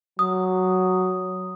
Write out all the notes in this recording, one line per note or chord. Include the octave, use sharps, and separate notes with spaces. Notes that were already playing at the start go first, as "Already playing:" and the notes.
F#3 D#6